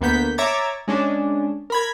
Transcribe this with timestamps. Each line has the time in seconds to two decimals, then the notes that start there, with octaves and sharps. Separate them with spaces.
0.01 D2 A#3 B3 G6 B6
0.38 C#5 E5 A#5 D6 G#6 A6
0.88 G#3 C#4 D4
1.70 A#4 B5 G#6